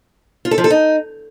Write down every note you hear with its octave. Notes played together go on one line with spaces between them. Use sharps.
F4
A4
F3
A4
D#4